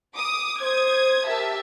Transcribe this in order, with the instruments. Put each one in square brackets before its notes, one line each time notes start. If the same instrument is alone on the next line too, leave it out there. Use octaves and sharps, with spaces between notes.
[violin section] D6 D#6
[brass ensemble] C5 [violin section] D#6 G#6
[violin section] G4 E5 A5 [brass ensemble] A#4